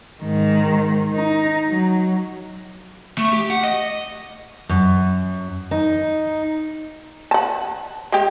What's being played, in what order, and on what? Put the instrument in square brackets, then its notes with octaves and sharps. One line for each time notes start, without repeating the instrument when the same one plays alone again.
[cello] G#2 D#3
D#4
F#3
[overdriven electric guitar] A3
G4
F#5
D#5
[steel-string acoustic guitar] F#2
D#4
[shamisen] F#5 A5
G#3 G4